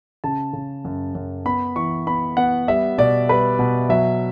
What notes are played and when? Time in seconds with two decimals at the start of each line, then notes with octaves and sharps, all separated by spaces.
0.24 C#3 A5
0.53 C#3
0.85 F#2
1.15 F#2
1.45 B3 B5
1.76 E3 C#6
2.07 B3 B5
2.37 B3 F#5
2.68 G3 E5
2.98 B2 D5
3.29 G3 B4
3.59 B2
3.89 F#3 E5